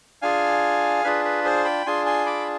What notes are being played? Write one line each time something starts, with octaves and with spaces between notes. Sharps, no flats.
D4 F4 G#4 F5 G#5
D4 F4 G#4 B4
B4
G#4 C5
G5 B5
D4 F4 G#4 G#5 C6
G#5 C6
B5 D6